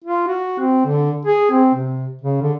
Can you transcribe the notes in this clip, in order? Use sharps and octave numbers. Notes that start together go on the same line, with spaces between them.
F4
F#4
C4
D3
G#4
C4
C3
C#3
D3